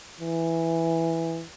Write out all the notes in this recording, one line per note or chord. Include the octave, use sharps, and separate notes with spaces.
E3